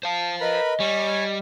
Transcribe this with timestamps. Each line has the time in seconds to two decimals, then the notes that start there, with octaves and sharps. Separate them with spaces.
0.03 C5 F5 A5
0.41 A#4 B4 D#5 B5
0.80 G3 C#5 G#5